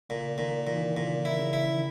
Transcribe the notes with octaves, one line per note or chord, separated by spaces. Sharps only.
A#2 C#3
A#2 D#3
A#2 E3
D#3
E3
A#2 C#3
E4
C#3
E4
D#3